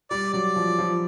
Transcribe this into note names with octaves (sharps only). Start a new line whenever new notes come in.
G3 D5
F#3 D5
F3
F3